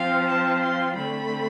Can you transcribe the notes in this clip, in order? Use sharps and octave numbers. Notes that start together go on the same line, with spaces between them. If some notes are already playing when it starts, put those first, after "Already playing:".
Already playing: F3 C4 F4 F5
A5
C6
D3 A3 C4 B5